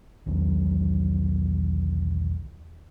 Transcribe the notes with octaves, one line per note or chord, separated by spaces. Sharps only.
B1 E2 D#3 F#3